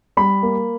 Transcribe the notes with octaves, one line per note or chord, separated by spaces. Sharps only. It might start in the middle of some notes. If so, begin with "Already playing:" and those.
G3 B5
A#3